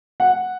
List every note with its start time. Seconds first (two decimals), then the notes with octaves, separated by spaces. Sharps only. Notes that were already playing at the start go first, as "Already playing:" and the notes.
0.20 F#5